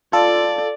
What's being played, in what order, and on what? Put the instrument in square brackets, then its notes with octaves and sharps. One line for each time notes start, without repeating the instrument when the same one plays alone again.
[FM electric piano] F4 A4 [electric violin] D5